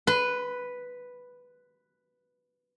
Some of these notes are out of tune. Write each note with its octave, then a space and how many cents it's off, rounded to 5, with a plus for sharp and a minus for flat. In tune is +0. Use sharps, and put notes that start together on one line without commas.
B4 +0 C6 -40